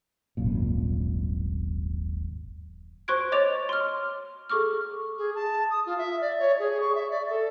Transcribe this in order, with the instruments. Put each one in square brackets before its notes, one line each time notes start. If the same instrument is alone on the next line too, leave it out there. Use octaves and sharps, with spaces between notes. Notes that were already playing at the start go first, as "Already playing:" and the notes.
[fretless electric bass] D#1 G#1 F#2 A#2
[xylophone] C5 C6 C#6 F#6 G#6 D7
C#5 D#5 D6 A6 F7
C6 F6
G#4 A4 C#6 D6 F6
[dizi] G#4
A5
D#6
F4
E5
D5
C#5
G#4
C#6
E5
D5
A4